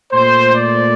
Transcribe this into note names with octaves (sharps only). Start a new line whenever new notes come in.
A#2 A3 C5
D5